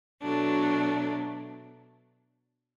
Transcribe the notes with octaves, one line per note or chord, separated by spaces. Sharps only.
B2 F#3 A3 D4